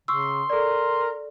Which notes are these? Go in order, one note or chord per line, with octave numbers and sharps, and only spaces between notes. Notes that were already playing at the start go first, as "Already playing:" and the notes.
C#3 C6 C#6 E6
A4 A#4 D5